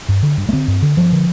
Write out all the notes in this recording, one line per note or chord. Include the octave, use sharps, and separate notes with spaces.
G2
D3
G2
A3
D3 C4
G2
D3
G2 F3
D3